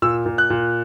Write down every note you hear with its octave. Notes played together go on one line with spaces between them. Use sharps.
A#2 E6
A#2
F#6
A#2